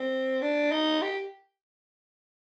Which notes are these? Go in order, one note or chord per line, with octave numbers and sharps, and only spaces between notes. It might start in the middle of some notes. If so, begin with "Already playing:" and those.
Already playing: C4
D4
D#4
G4